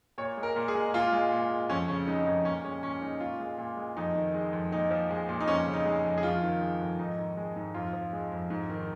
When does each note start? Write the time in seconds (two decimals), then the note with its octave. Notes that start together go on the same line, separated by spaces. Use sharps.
0.18 A#2 C#5
0.37 G#3
0.43 A#4
0.56 A#2
0.68 G#4
0.75 G#3
0.94 A#2 F4
1.13 G#3
1.32 A#2
1.51 G#3
1.70 F2 C#4
1.88 C#3 C#4
2.07 G#3 D#4
2.26 F2 D#4
2.45 A#2 C#4
2.64 G#3 C#4
2.83 A#2 C#4
3.02 G#3 D#4
3.20 A#2 F4
3.40 G#3
3.58 A#2
3.77 G#3
3.96 F2 D#4
4.16 D#3
4.34 G#3
4.53 F2
4.72 A#2 D#4
4.91 F3
5.10 G#3
5.29 A#2
5.40 D#4
5.48 F2 C#4
5.66 C#3
5.73 D#4
5.85 G#3
6.04 F2
6.18 G#4
6.23 F2 F4
6.42 D#3
6.61 G#3
6.80 F2
6.99 G#2 D#4
7.18 D#3
7.37 G#3
7.56 G#2
7.74 F2 F4
7.93 F3
8.13 G#3
8.32 F2
8.50 G#2
8.70 D#3